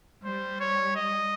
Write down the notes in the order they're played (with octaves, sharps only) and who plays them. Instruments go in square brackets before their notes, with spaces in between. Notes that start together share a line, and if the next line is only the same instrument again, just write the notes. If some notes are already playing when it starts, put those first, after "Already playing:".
[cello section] G3 [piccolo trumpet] C5
[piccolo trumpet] C#5
D#5